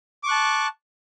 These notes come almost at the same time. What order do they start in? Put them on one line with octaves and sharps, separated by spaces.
D6 C#6 F#6 A5